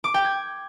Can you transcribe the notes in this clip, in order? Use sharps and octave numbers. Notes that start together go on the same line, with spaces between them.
D6
G5
G#6